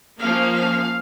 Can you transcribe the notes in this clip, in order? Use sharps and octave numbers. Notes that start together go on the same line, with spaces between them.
F3 A#3 C#4 F5
F5